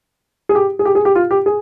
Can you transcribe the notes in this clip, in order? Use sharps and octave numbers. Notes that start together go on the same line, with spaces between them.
G#4
G4
G#4
G4
G#4
G4
F4
G4
G#4